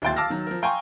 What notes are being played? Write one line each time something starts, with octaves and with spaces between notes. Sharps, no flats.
D1 D#2 E4 G5 C6 A6
F5 A5 D6 E6 F6 A#6
D#3 F#3
F3 A#4
F5 G5 G#5 A#5 C6 C#6